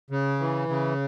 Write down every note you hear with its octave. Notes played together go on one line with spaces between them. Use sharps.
C#3
E3
C#3